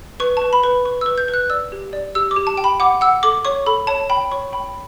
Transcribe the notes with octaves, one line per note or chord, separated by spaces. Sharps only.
B4 C#6
A5
B4
B5
B4
B4 C#6
E6
B4
G6
B4
F#6
D5 E6
G4
D5
G4 E6
D6
G4
A5
G5
B5
F#5 D6
F#5 E6
A4 D6
C#5 C#6
A4 B5
C#5 A5
G5 B5
C#5 C#6
G5 B5